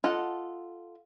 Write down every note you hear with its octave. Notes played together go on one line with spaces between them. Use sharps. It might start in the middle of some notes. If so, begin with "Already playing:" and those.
F4 A4 D#5 F#5